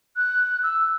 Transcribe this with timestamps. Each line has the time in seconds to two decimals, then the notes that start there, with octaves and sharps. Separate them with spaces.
0.16 F#6
0.63 E6